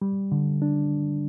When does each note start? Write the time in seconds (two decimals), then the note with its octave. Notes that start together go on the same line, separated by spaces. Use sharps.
0.02 G3
0.32 D3
0.62 D4